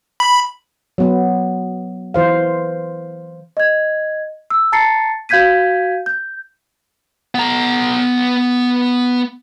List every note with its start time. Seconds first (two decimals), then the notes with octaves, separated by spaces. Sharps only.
0.20 B5
0.98 F#3 B3
2.14 E3 C5 F5
3.57 D#5 G#6
4.50 E6
4.72 A5 A#5 A6 C7 C#7
5.29 F#4 F5 G6 G#6 B6 D#7
6.06 G6
7.35 B3 A#5